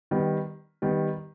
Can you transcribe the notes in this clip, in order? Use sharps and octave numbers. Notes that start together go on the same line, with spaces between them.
D#3 G3 B3
D#3 G3 B3